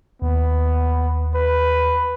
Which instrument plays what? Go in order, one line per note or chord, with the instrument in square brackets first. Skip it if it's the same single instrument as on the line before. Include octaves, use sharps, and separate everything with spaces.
[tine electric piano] D#2 [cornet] B3
[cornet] B4